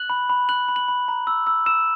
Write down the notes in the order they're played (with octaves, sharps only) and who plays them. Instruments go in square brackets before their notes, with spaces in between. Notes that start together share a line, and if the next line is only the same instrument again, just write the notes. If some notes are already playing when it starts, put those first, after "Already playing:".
Already playing: [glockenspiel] F#6 F#7
B5
B5
F#6 F#7
B5
F#7
B5
A#5
E6
E6
E6 E7